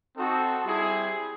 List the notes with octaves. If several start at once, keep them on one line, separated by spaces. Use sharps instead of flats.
C4 D#4 F#4 A4
G3 C4 E4 G#4